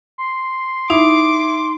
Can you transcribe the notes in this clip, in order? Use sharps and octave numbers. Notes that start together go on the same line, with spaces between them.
C6
D#4 E4 D6